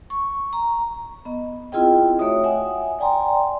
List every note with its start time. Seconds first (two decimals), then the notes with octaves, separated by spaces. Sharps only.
0.10 C#6
0.53 A#5
1.25 B3 D#5
1.72 C4 E4 F4 G#4 D#5 G5
2.19 A3 F#4 C#5 E5 D#6
2.44 E5 F#5 G#5
2.99 D5 G5 G#5 A#5 C6